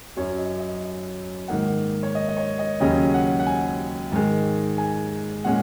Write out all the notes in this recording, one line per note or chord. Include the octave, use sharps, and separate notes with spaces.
F#2 F#3 C#4 C#5
D#5
D#5
G#2 D#3 A#3 D#4 F#5
C#5
D#5
D#5
C#5
D#5
D#2 C#3 F#3 C#4 D#5
F#5
F#5
G#5
G#2 D#3 G#3
G#5
A#2 G#3 C#4 F#5